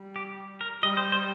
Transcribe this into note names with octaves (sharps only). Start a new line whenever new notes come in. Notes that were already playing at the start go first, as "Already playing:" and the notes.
Already playing: G3
G4
A#4
G3 D#5
C5
C5